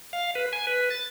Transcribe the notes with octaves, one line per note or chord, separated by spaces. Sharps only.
F5
B4
G#5
B4
A6